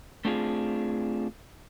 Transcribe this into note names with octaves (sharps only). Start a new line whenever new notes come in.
A3 C4 D4 F4 G4 G#4